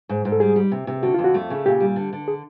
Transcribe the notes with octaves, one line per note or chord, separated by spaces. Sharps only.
G#2
G#2
A4
G3 G#4
G3
C3
C3
D3 F#4
F2 F4
F#4
A3
C#3
A#2 G4
G3
D3
D3
G#4